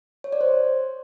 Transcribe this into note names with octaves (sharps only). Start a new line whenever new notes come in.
C#5
D5
C5